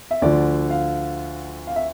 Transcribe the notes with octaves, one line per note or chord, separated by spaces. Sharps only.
E5
D2 D3 F3 D5
F5
F5
E5